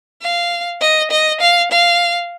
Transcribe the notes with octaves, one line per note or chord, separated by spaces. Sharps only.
F5
D#5
D#5
F5
F5